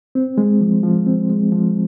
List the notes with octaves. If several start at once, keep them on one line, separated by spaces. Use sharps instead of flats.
C4
G#3
F3
F3
C4
G#3
F3